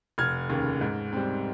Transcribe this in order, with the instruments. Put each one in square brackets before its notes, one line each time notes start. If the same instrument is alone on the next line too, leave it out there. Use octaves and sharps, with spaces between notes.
[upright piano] F1 F6 G#6
D#2 C#3
G#2
G3 C4